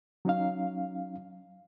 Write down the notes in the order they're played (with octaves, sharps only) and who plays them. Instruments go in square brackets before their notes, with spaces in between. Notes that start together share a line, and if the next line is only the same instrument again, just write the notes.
[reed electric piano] F#3 C#4 D#4 F5